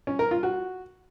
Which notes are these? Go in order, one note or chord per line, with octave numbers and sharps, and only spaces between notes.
C#4
A#4
F4
F#4